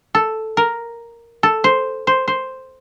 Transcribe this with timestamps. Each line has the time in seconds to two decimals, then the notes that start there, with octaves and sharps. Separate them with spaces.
0.15 A4
0.57 A#4
1.43 A4
1.64 C5
2.07 C5
2.28 C5